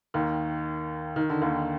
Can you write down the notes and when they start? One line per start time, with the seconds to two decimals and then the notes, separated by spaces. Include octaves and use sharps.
0.14 D#2 D#3
1.16 D#3
1.30 D3
1.42 D#2 D#3